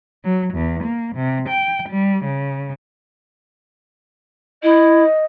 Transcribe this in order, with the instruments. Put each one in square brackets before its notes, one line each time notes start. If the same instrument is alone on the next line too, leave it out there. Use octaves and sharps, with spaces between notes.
[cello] F#3
E2
A#3
C3
G5
G3
C#3
[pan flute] E4 [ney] D#5